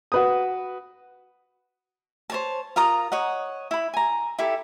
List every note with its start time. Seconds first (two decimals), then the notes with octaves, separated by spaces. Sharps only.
0.12 F#4 B4 D#6
2.30 C5 C#5 A5
2.76 F4 A#4 A#5 D#6
3.12 C#5 D#5 F#5
3.71 E4 B5
3.94 G#5 A#5
4.39 E4 G4 A4